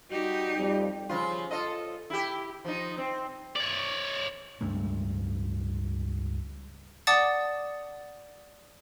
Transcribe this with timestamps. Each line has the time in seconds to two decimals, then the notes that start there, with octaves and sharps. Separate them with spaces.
0.10 G3 D#4 F#4 G4
0.57 F2 G3
1.09 C#3 F3 F4
1.51 F4 A4 D#5
2.10 E4 G4
2.65 F3 D#4
2.97 C4
3.56 C#5 D5
4.61 C#2 G2 C#3 A3
7.07 D5 F#5 A5 D6 D#6 A6